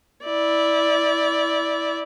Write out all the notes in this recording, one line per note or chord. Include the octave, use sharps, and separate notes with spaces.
E4 D5